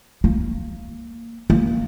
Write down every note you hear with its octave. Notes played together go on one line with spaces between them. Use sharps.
A#3
A#3